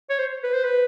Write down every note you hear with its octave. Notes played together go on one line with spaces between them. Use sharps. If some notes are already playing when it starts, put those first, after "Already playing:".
C#5
C5
B4
C5
B4